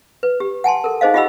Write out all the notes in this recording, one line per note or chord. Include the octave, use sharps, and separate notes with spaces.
B4
G4
F#5 G#5 A5 C6
A4 A#4
D#4 G#4 C5 D#5 F5
F4 G4 D#5 F#5 B5 E6